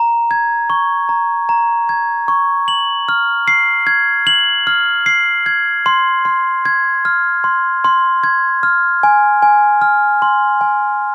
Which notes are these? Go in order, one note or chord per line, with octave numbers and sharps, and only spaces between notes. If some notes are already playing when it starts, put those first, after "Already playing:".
Already playing: A#5
G#6
C#6
A#5
A#5
G#6
C#6
F#7
F6
C7
G#6
F#7
F6
C7
G#6
C6
C6
G#6
F6
C6
C6
G#6
F6
G#5
G#5
F6
C6
G#5